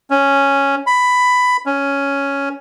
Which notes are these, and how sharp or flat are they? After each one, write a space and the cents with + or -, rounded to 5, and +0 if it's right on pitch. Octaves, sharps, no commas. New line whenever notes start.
C#4 +0
B5 +10
C#4 +5